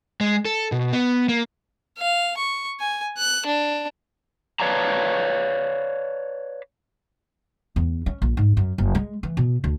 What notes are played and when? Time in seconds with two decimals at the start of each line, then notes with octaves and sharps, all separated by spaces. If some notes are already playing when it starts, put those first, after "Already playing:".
0.21 G#3
0.45 A4
0.72 B2
0.93 B3
1.29 A#3
1.98 F5
2.37 C#6
2.80 G#5
3.18 F#6
3.46 D4
4.60 B4 C#5 D5 F5 A5 A#5
7.76 E2
8.06 C#4
8.22 A#1
8.37 G#2
8.57 F#2
8.78 F#1
8.95 G#3
9.23 E3
9.37 B2
9.64 D2